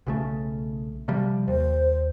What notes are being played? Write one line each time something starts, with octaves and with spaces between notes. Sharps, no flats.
B1 C#3 A3
C3 F3 G3
D#2 C5